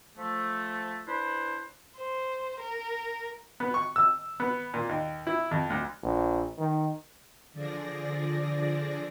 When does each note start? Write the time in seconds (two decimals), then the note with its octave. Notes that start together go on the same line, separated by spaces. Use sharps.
0.17 F3 A3
1.07 D4 E4 B4 C5
1.96 C5
2.59 A#4
3.60 B3
3.74 C#6
3.96 E6
4.40 B3
4.74 A#2
4.89 D#2
5.27 E4
5.51 F2
5.70 D2
6.03 A#1
6.58 D#3
7.53 D3 F3 D4 G#4 D5 A#6